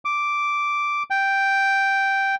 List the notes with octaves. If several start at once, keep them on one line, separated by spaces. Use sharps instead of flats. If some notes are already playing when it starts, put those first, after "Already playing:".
D6
G5